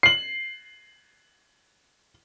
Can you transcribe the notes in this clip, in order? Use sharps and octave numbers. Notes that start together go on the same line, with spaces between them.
C7 F#7